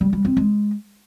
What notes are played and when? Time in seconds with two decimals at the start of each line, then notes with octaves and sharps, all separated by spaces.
0.01 G3
0.13 G3
0.25 C4
0.37 G#3